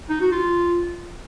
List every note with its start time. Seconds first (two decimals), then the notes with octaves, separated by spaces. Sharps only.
0.09 D#4
0.20 F#4
0.32 F4